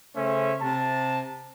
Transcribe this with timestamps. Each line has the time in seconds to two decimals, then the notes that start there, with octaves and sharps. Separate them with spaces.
0.15 C#3 A3 C#4 C5 E5
0.61 C3 A5